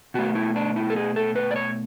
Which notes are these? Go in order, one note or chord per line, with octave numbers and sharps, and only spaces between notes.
B2 A3 F#4
E4
D4
E4
A4
G#4
A4
B4
D5
C#5